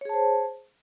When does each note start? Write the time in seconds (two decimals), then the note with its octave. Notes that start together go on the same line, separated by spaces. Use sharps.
0.01 C#5
0.05 G#4
0.09 A5
0.13 C5